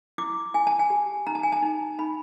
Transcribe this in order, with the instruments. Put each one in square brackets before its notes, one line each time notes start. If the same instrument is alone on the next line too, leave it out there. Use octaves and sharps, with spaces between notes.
[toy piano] E4 D6
E4 G#5
A5
G#5
G4
D#4 A#5
A5
G#5
A5
D#4
D#4 B5